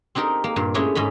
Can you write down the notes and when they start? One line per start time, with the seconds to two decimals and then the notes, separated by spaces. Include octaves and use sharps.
0.15 C4 D4 D#4 G4 A#4
0.44 A#3
0.56 G2 A#2
0.74 G#3 A3 C#4 D4 E4 D#5
0.95 G#2 C#4 D#5 B5